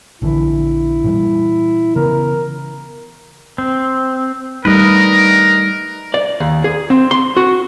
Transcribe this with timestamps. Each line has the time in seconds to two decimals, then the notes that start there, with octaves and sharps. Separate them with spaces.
0.22 A#1 D3 E3 E4
1.04 A#2 E3 G3
1.96 C#3 E3 B3 A#4
3.58 C4
4.65 G3 A3 D#4 A#4 B4 D#5
6.14 D5
6.40 D#2
6.64 G#4
6.90 C4
7.11 C6
7.37 F#4